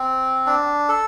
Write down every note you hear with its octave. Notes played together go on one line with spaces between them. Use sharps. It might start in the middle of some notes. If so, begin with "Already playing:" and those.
Already playing: C4
D4
A4